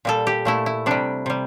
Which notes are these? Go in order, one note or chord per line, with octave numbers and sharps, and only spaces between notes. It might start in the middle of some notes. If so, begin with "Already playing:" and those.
A#2 G3 A4
G4
A#2 A3 E4
E4
C3 G3 D4
C3 G3